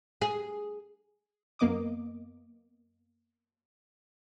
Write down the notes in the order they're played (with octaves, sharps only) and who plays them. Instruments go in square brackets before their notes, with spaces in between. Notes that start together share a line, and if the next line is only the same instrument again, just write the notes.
[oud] G#4
[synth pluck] F#2 A#3 B3 D#5 D6 D#6